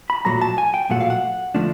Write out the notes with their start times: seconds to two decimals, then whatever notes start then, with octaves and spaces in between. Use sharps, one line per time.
0.10 B5
0.25 B1 A#2 F#3 A3 A#5
0.41 A5
0.58 G#5
0.74 G5
0.89 B1 A#2 F#3 A3 F#5
1.00 F5
1.10 F#5
1.55 D3 F3 A3 D4